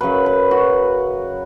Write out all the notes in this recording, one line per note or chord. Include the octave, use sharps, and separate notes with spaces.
F#2 C#3 F#3 B4
B4
F#4